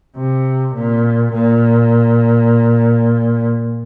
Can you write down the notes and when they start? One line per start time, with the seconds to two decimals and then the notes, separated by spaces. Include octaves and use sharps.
0.17 C3
0.75 A#2
1.33 A#2